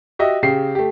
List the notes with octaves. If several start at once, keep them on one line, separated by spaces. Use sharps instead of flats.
F#4 G4 D#5 E5
C#3 G4 C7
A3 G4